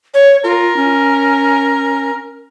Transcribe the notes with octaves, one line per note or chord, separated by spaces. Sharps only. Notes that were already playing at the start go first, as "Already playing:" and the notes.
C#5
F4 A#4
C#4